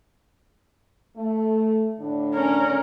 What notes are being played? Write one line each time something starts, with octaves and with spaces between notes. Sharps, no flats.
A3
A2 D3 D4
C#4 A#4